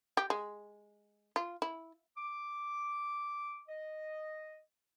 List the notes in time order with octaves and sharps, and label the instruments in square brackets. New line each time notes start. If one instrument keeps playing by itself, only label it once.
[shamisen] G4
G#3
F4
E4
[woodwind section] D6
D#5